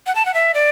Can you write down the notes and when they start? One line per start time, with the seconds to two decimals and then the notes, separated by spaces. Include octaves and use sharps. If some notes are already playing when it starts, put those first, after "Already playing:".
0.07 F#5
0.15 A5
0.26 F#5
0.34 E5
0.54 D5